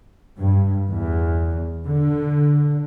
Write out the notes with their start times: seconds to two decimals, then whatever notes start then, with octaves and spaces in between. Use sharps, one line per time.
0.38 G2
0.89 E2
1.86 D3